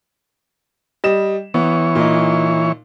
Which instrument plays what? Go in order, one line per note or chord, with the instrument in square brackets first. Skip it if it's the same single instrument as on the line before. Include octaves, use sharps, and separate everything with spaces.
[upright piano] G3 D#5 E7
[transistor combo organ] E3 C#5 [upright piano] B3
[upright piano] A#2 D#4